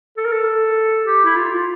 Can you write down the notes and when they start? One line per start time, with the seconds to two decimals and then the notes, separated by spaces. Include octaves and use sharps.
0.17 A4
0.25 A#4
0.32 A4
1.06 G4
1.25 E4
1.36 F4
1.54 F4